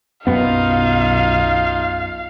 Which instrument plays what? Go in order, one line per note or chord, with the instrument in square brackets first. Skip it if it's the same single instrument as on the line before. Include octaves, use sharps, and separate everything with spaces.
[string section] B1 [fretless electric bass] F#2 B3 [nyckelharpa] D#4 F4 [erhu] F5